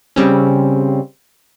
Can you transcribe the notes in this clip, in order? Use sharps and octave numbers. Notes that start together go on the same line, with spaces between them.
C#3 G3 C4 C#4